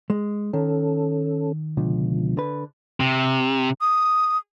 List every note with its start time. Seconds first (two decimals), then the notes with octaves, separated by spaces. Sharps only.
0.10 G#3
0.53 D#3 C#4 A4
1.77 C#2 B2 D3 F3
2.37 D3 B4
3.00 C3
3.81 D#6